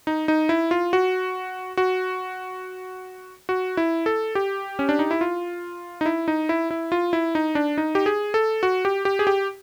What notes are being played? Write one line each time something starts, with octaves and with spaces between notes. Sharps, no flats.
D#4
D#4
E4
F4
F#4
F#4
F#4
E4
A4
G4
C#4
D4
D#4
E4
F4
D#4
E4
D#4
E4
E4
F4
E4
D#4
D4
D#4
G4
G#4
A4
F#4
G4
G4
G#4
G4